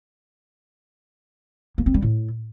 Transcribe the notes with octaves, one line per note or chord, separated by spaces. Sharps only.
A#3
C4
G3
A2